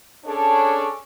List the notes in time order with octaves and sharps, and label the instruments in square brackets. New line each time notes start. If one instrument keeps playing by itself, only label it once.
[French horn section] C#4 D4 G#4 A4 C#5 D5